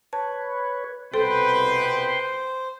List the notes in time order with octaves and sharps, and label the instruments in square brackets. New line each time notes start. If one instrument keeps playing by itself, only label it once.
[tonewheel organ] B4 C#5 [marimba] A5
[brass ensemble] C2 B2 B4 [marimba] A4 [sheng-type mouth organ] C5 [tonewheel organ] G5 C6